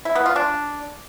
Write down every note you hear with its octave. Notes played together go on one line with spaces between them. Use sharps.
E4
B3
F4
D4